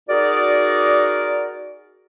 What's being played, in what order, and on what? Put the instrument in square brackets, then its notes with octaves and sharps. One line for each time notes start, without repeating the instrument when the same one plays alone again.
[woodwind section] D#4 F#4 G#4 A#4 D5